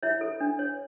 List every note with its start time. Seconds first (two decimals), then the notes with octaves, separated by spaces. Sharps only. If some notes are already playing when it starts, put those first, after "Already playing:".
0.03 E4 C#5 E5
0.21 A4
0.40 D4
0.59 C#5